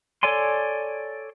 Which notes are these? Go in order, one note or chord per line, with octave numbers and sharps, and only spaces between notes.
A4 C#5 D5 G#5 C6